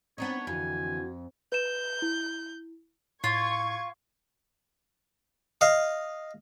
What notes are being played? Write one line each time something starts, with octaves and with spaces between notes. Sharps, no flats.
B3 C4 D4 D#4 C#5
F2 D3 E3 F#4 G#5
B4 G6 E7
E4
A2 F4 C#6 G#6
D#5 F5